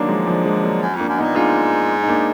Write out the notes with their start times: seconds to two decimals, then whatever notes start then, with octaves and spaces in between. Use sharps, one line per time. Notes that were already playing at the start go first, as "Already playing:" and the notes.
Already playing: D3 D#3 F#3 A#3 D4
0.08 F3 G#3
0.27 F3 G#3
0.45 F3 G#3
0.63 F#3 A#3
0.82 F#2
0.95 F2 A#3 D4
1.09 F#2
1.18 A#2 B3 D#4
1.35 G#2 D4 F4
2.03 D#4
2.08 A#3 D4